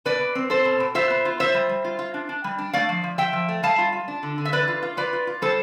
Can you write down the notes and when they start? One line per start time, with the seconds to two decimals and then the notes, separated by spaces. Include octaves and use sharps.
0.05 B2 B4 D5
0.21 B2
0.35 C4
0.50 C4 A4 C5
0.65 B2
0.80 B2
0.95 F4 C5 E5
1.10 B3
1.25 F4
1.40 F4 C5 E5
1.54 G3
1.69 G3
1.84 F4
1.99 F4
2.14 D4
2.29 D4
2.44 G3
2.58 D4
2.73 A3 D5 F5
2.89 F3
3.04 F3
3.18 F3 E5 G5
3.33 F3
3.49 A3
3.63 G3 F5 A5
3.78 F4
3.93 F4
4.08 D4
4.23 D3
4.38 D3
4.45 E5
4.52 E3 B4 D5
4.68 F4
4.82 F4
4.97 F4 B4 D5
5.13 F4
5.27 F4
5.42 G3 A4 C5